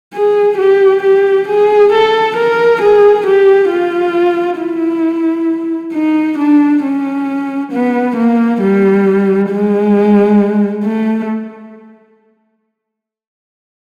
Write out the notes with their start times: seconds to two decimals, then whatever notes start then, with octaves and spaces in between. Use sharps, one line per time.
0.14 G#4
0.58 G4
1.03 G4
1.48 G#4
1.93 A4
2.37 A#4
2.82 G#4
3.27 G4
3.70 F4
4.59 E4
5.93 D#4
6.38 D4
6.84 C#4
7.72 B3
8.17 A#3
8.61 G3
9.50 G#3
10.85 A3